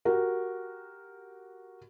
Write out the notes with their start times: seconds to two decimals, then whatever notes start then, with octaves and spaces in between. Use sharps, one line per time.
0.05 F#4 G4 A#4